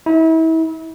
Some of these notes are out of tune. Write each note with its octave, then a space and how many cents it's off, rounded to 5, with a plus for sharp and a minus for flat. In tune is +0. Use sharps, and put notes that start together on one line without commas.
E4 -35